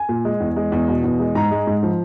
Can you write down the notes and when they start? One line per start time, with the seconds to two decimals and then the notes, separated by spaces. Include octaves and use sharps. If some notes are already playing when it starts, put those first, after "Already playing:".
Already playing: G#5
0.09 A#2
0.25 G#3
0.40 E2
0.56 G#3
0.72 E2
0.88 B2
1.04 E2
1.20 G#3
1.35 G#2 A#5
1.51 G#3
1.67 G#2
1.83 F3